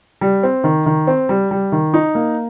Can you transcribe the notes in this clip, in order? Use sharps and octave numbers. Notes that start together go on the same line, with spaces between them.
G3
C4
D#3
D#3
C4
G3
G3
D#3
D#4
A#3